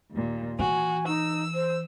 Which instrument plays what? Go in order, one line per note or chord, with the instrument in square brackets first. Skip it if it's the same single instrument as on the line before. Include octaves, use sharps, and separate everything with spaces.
[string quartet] D#2 A#2
[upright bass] E3 [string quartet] F#4 [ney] G#5
[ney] D#4 [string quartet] E6
[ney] C5